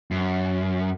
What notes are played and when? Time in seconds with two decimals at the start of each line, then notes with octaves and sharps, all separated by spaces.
0.11 F#2